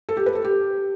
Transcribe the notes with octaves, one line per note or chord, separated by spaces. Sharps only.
A4
G4
B4
A4
G4